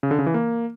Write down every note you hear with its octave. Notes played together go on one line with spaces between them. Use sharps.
C#3
D3
C#3
E3
A#3